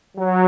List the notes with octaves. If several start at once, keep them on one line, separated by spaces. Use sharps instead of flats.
F#3